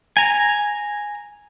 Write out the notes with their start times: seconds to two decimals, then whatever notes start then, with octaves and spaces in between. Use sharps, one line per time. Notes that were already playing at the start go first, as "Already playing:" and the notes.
0.17 G#5 A#5